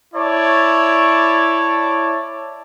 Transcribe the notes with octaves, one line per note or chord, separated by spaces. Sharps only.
E4 C#5 D5 A5